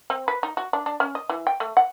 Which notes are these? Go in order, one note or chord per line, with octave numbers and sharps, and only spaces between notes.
C4
B4
D#4
F#4
D4
D4
C#4
D#5
E3
G5
A3
F#5